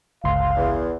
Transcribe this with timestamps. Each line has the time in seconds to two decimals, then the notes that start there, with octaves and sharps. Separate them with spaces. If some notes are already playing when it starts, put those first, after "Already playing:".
0.24 G1 C#2 F5 C6
0.57 E2